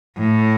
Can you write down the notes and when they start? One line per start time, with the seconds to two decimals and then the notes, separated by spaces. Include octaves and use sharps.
0.18 A2